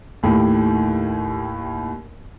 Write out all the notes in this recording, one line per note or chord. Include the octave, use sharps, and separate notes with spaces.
D#2 A2 G4